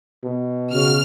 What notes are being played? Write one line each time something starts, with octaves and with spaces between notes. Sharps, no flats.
B2
C#3 F#4 F6